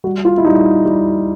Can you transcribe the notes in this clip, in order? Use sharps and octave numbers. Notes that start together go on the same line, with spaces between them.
G3 F#4
F4
E4
G3 D#4
G3